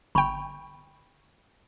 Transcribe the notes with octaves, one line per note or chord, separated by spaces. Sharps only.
G1 G5 B5 C#6